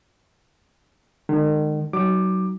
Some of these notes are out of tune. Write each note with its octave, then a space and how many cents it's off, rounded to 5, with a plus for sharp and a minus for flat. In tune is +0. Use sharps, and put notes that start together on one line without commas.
D#3 -40 G#3 +0
F#3 +25 D#4 +0 D6 +15